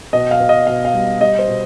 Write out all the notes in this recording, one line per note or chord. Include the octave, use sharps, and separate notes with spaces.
B2 D#5
F5
B2
D#5
B2 F5
F5
G3
G3 D#5
C5
B2